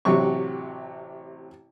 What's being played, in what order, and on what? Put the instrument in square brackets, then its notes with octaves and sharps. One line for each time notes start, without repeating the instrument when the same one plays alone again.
[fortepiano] A1 C3 F#3 G4 C#6